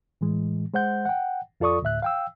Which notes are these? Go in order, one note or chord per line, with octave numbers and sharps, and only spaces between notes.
A2 E3 G#3
G#3 C5 F#5 G6
F#5 G5
F2 F4 A4 D5 C#6 D#6
D2 A2 E5 F#6
F5 G5 E6